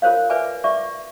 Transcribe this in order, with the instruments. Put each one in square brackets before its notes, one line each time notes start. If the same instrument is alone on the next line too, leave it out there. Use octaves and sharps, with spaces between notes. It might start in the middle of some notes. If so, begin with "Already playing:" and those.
[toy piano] F4 A#4 C5 C#5 F5
B4 D5 E5 G#5 D6
D5 E5 C#6 D6